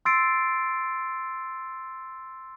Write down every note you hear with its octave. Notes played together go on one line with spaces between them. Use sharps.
C6 E6 A6 C7 D7